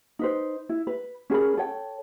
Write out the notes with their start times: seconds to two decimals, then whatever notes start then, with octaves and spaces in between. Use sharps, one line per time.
0.19 D#4 B4 C5
0.69 E4
0.87 B4
1.30 C#4 G#4 A#4 B5
1.57 A4 C#5 G5